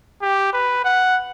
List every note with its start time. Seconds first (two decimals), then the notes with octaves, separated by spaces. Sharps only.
0.22 G4
0.53 B4
0.85 F#5